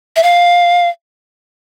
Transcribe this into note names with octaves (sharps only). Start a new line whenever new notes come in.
E5
F5